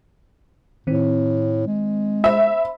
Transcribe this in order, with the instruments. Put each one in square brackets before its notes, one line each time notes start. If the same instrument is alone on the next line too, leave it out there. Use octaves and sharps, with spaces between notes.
[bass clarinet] A2 [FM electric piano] D#3 C4
[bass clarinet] G#3
[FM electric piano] C5 B5 [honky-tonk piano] E5